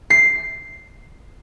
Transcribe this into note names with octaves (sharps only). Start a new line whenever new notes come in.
C7